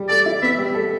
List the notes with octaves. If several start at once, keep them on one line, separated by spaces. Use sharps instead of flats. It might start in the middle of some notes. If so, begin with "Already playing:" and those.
Already playing: G3
A4 D5
E4
B3 E5
G3
A4